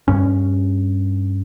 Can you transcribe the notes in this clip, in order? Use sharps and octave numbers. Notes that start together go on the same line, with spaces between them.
G2 C#4